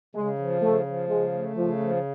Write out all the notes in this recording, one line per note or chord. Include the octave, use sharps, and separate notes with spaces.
C#3 G#3
F3
C#3 A3
F3
C#3 G#3
A3
C#3 F3
F3